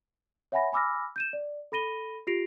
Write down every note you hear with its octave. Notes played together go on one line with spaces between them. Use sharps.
C#5 E5 F#5 G#5 B5 A#6
G#5 B5 D6 E6 F6 A#6
G6 D#7 E7
D5
A4 B5 A#6 D#7 G7
F4 G4 A#6 C7 D7 F7